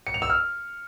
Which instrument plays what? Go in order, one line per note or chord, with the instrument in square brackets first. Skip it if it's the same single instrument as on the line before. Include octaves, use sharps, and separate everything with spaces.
[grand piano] C#7
F7
E6
F6